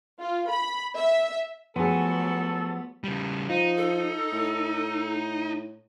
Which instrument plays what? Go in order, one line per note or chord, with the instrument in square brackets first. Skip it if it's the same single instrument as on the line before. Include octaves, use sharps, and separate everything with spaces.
[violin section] F4
B5
E5
[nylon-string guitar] F3 G#4 [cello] F#3 A3 [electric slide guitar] B3 [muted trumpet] A4
[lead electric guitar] C#3 G3
[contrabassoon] F3 [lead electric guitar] D#4
[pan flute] A4
[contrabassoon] A2